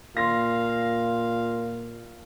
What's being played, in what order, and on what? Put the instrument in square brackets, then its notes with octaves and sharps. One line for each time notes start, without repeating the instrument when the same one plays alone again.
[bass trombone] A#2 [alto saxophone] F5 [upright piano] C6 A#6